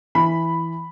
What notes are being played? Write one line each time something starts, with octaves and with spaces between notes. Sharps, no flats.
E3 B5